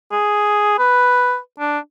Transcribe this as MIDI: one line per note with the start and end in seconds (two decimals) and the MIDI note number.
0.12 0.76 68
0.78 1.37 71
1.60 1.79 62